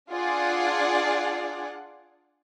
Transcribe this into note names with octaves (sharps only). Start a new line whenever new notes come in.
D4 F4 G#4 D5 F#5